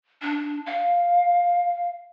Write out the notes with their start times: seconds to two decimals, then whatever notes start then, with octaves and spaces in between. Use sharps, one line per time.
0.22 D4
0.66 F5